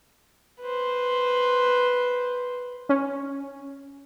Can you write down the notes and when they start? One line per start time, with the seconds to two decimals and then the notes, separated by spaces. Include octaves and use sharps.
0.61 B4 C5
2.89 C#4